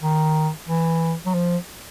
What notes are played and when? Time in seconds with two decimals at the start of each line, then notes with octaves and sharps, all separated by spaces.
0.03 D#3
0.68 E3
1.26 F#3
1.34 F3